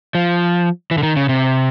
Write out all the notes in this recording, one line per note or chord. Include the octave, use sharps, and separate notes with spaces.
F3
E3
D3
D#3
C#3
C3